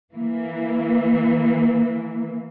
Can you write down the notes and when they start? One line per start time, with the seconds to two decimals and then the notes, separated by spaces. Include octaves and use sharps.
0.13 E3 A#3